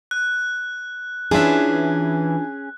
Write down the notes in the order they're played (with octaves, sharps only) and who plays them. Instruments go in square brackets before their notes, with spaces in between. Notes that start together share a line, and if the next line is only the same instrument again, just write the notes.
[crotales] F#6
[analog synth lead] E3 [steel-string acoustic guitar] C#4 G#4 [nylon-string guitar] D4 F4 E5